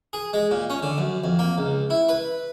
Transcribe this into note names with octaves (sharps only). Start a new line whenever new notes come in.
G#4
G#3
A#2
C#4
D3
F#2
F2
A#3
C#2
E4
B4